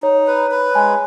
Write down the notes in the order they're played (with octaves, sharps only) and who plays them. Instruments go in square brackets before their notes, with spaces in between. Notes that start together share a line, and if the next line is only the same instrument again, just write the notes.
[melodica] D#4 [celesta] C#5
[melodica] B4
B4
[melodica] G#3 [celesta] G#5